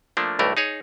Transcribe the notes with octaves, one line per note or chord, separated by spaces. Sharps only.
F3 A3 A#3 D4
B1 G2 E3 A3 A#4
D#4 G#4 C#5